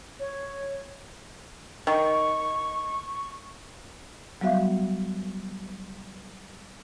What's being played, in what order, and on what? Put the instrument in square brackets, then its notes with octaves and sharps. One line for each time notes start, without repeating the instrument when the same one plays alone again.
[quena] C#5
[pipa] D#3 [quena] C#6
[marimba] F#3 G3 B3 F#4 E5 F5